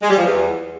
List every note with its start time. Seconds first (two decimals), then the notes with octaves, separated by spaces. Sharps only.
0.02 G#3
0.10 G3
0.18 F3
0.25 E2